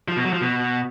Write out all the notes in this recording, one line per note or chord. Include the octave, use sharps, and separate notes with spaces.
F3
B2
F#3
F3
B2